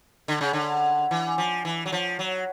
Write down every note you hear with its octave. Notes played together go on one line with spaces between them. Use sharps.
D3
C#3
D3
E3
F3
E3
F#3
F3
F#3